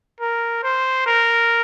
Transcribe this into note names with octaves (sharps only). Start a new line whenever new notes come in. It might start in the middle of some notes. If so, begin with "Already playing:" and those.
A#4
C5
A#4